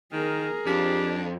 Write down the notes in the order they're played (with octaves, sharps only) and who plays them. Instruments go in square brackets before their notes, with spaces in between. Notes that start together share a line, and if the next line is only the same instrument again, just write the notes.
[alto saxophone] D#3 [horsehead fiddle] G#4 A#4
[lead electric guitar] F2 [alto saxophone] D4 [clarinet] G4